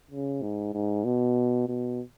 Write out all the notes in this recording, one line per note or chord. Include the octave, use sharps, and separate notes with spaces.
C#3
G#2
G#2
B2
B2